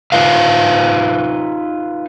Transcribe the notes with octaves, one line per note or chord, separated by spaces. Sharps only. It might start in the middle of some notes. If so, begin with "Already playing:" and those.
D#4 F4 B4 E5 F5